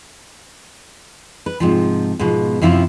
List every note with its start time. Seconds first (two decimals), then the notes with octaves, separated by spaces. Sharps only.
1.46 B4
1.60 G#2 C3 F3
2.19 G#2 B2 F3
2.62 F#2 C3 F3 E4 F4